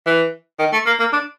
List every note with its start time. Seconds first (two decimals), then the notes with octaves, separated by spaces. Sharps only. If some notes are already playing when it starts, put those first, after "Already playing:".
0.06 E3
0.59 D#3
0.73 A3
0.86 A#3
0.99 A#3
1.13 D4